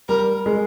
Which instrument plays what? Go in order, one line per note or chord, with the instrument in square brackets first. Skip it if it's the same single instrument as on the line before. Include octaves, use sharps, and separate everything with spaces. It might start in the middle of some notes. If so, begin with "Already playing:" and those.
[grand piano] G3 [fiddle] A#4
[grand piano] G#3